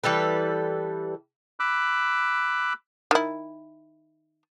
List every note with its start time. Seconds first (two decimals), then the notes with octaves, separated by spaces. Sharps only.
0.04 E3 G3 A4 B4
1.60 B5 D6 E6 F#6
3.11 D#3 E4